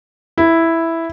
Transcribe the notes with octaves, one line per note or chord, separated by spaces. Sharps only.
E4